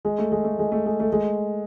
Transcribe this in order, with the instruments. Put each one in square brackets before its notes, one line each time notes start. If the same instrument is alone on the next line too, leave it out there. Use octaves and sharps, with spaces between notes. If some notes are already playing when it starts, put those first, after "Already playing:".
[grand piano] G#3
A3
G#3
A3
G#3
A3
G#3
A3
G#3